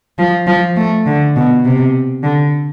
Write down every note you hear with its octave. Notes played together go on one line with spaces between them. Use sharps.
F3
F3
A3
D3
B2
C3
D3